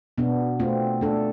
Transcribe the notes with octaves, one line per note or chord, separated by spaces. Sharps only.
B2 B3 D4
A3 C4 F4
A3 D4 A4